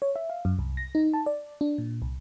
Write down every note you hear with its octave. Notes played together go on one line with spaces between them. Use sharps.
C#5
E5
F5
F#2
C2
A#6
D#4
A5
D5
D4
A#2
C2